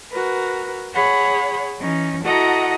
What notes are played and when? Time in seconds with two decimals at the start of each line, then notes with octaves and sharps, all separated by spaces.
0.10 F#4 A#4 B4
0.93 G#4 C#5 F#5 B5
1.79 E3 C#4 D#4
2.24 E4 F#4 A4 D#5 F#5 A#5